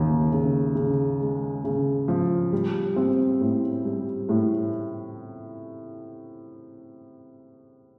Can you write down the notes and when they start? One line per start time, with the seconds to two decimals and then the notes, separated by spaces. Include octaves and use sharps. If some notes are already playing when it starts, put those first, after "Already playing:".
Already playing: D#2 C#3
0.32 C#3
0.75 C#3
1.20 G#3
1.64 C#3
2.08 F3
2.53 G3
2.96 C4
3.41 A2
3.85 G3
4.29 A2